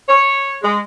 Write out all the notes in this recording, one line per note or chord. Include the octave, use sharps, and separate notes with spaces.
C#5
G#3